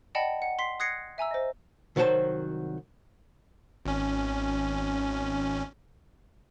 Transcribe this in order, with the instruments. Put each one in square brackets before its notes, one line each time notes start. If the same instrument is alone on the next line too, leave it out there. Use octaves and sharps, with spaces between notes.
[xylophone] D5 D#5 F#5 G5 A5 B5
F#5
C6 B6 C7
D#6 F#6 G#6 A#6 C7 C#7
E5 G#5 A#5 E6
C5 D#5
[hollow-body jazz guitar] C2 D#3 F#3 F#4 C5 A5
[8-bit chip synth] G#1 C#4